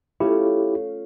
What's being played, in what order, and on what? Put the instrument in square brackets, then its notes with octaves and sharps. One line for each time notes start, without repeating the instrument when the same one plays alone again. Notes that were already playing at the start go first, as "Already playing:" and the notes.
[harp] A3 C#4 F4 [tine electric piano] E4 G4